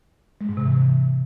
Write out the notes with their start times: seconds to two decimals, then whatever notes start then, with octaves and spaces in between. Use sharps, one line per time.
0.41 G#3
0.49 G#2
0.57 C3
0.66 E3